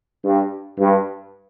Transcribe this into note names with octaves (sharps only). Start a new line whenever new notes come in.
G2
G2